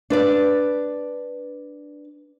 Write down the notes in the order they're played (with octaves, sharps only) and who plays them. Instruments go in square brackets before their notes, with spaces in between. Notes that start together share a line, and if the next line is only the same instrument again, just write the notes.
[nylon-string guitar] D4 B4 D5